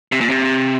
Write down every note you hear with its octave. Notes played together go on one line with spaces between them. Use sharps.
C3
A#2
C3